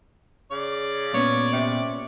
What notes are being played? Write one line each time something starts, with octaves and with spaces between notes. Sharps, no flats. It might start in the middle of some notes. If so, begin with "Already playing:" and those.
C#3 D5
A#2 B3 C#4 C#5
C3